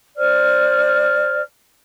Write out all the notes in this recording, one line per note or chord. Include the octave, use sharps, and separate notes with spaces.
C5 D5 F6